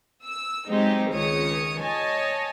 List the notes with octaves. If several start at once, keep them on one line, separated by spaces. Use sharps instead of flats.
E6
F#3 G#3 C4 D#4 G4
C#2 D#3 C#5 D#6 C#7
C#5 D#5 G#5 A5